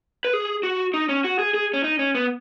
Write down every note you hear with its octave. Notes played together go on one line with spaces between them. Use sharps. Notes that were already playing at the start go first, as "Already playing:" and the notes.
B4
G#4
F#4
D#4
C#4
F#4
G#4
G#4
C#4
D#4
C#4
B3